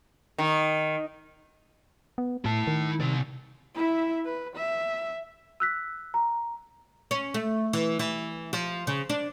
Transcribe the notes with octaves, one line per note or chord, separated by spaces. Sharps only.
D#3
B3
A2 E4 A5
D#3
C3 D5
E4 E5
B4
E5
E6 F#6 B6
A#5
C#4
A3
E3
E3
F3
C#3
D4